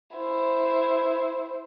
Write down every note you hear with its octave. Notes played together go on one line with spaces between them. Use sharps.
E4 C5